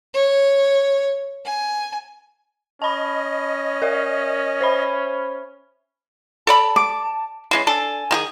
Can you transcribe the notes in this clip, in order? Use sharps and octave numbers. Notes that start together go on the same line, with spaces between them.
C#5
G#5
C#4 D#5 A5 B5
A#4 D5 E5
C5 E5 B5
A4 D5 A5 B5
D6
E3 G#3 C#4 C7
D4 A4 G#5
D#3 G4 G#4